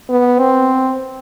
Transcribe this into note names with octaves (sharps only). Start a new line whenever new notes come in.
B3
C4